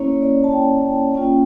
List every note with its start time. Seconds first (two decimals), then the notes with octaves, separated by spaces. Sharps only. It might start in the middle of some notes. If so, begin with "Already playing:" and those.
Already playing: A#3 C#4 E4 C#5
0.22 D5
0.44 A5
0.53 G5
1.14 A#3 C#4 F4 G5